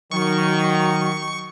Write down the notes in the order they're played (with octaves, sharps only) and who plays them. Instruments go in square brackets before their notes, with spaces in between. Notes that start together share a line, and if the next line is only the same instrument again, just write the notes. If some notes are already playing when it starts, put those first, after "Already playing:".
[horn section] D#3 [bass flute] F#3 [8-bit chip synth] C#6